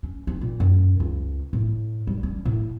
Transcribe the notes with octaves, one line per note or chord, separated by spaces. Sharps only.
C#4
C4
A#2
F#2
C#2
A2
G3
C#4
A2